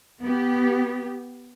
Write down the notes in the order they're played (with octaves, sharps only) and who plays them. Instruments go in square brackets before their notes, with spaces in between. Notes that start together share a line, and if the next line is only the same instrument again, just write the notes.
[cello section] B3 G4